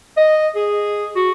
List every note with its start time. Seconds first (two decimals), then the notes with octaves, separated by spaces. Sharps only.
0.17 D#5
0.56 G#4
1.16 F#4